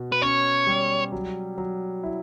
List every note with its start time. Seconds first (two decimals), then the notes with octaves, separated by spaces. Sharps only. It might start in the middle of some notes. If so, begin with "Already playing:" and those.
Already playing: B2 F#4
0.12 B4
0.22 C#4 C#5
0.67 G3
1.12 F#3
1.58 F#3
2.03 E4